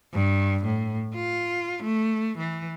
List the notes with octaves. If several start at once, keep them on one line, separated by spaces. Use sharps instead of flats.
G2
A2
F4
A3
E3